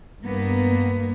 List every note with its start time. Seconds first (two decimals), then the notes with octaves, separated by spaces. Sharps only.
0.25 G2 A#3 B3